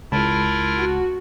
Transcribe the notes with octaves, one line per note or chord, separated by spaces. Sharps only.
C#2 E4 F4 A#4 A5 B5
F#4